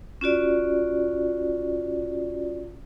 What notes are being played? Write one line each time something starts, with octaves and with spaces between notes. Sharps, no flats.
C#4 F4 F#4 D5